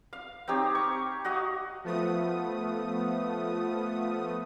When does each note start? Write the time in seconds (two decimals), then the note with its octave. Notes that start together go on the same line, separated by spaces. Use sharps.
0.13 F5
0.48 C4 D#4 G4 C#5
0.75 C#6
1.25 F#4 D#5 F5
1.84 F3 A3 B3 D#6